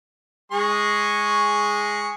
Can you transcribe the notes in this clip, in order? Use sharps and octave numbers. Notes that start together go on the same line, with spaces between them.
G#3 G#4 C#6